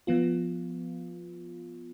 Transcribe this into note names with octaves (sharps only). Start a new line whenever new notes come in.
F3 B3 F4